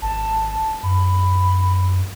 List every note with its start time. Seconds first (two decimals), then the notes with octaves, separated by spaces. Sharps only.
0.02 G#1 A5
0.83 F#2 B5